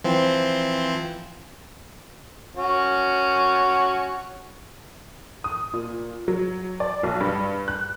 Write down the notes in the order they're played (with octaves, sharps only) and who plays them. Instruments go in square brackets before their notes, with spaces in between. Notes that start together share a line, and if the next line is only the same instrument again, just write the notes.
[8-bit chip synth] E3 F3 C4
[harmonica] C#4 F#4 C#5
[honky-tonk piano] D#6
A#2
F#3
D5
B1
G2
F#6